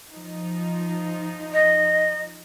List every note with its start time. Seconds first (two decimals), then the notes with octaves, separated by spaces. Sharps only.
0.11 F3 D#4
1.53 D#5